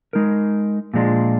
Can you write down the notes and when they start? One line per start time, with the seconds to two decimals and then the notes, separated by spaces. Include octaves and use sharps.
0.13 G#3 D#4 A#4
0.94 A#2 F3 G#3 D4